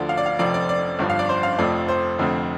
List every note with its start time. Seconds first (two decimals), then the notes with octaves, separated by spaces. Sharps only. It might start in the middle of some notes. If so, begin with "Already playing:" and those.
Already playing: D2 D3 F3 D5
0.09 F5
0.17 D5
0.26 F5
0.39 F1 F2 F3 C4 D5
0.54 D5
0.69 D5
0.99 G1 G2 F3
1.10 F5
1.19 D5
1.29 C5
1.43 F5
1.58 F1 F2 F3 A3 C4 D5
1.88 C5
2.18 F1 F2 D3 A3 C4